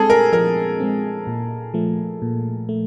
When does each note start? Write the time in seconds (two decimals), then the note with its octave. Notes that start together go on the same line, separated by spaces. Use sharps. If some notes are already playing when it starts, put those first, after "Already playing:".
Already playing: G#3 C4 G#4 A4
0.10 A#4
0.33 F3 A#4
0.80 G#3 C4
1.27 A#2
1.74 F3 A3
2.22 A#2
2.69 A3